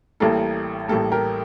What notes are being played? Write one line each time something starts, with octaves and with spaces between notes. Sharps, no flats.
A1 A2 G3 A#3 A4
A1 A2 G3 A#3 A4
G4 A#4